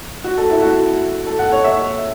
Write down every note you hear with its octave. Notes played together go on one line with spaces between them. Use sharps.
F#4
A4
E4
F#4
A4
F#5
C#5
E5